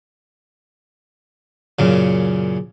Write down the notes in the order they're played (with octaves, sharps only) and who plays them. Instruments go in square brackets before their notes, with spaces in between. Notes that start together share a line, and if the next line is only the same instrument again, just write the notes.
[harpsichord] F#2 A#2 C#3